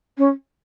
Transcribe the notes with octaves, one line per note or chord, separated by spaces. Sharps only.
C#4